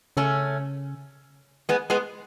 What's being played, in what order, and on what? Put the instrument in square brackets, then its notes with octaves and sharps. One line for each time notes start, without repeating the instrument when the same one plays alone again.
[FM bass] C#3 [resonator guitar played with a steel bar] A3 C#4
[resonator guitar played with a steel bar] G#3 B3
G#3 B3